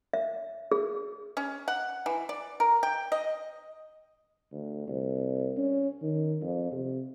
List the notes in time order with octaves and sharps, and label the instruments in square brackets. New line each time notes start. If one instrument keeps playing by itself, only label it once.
[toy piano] E5
G#4
[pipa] C#4
F#5
E3
D5
A#4
G5
D#5
[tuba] D2
C2
C#4
D#3
F2
C3